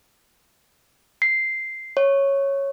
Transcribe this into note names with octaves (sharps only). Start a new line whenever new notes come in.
C7
C#5